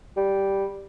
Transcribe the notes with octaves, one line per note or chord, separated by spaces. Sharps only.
G3